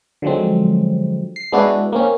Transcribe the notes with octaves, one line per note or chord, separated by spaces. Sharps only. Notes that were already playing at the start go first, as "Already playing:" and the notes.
D3 F3 F#3 G#3 C4
C7
G#3 B3 D4 E4 F#4
A#3 C4 C#4